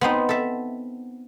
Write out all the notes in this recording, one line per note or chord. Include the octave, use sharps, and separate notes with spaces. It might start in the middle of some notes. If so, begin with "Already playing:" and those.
B3 C4 D#4
A4 E5